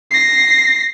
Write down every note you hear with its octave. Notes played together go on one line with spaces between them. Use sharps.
A#6 C7